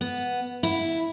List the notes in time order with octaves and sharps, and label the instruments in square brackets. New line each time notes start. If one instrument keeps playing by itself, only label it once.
[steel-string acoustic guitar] B3
E4